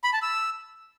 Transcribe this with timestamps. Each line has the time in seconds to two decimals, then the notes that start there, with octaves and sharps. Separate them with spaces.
0.04 B5
0.13 A5
0.22 E6